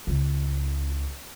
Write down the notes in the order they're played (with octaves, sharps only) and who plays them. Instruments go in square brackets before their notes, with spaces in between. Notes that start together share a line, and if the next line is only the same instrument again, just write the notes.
[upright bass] C#2 C#3